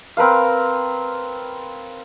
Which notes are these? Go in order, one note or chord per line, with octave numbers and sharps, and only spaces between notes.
C4 A#4 B4 F5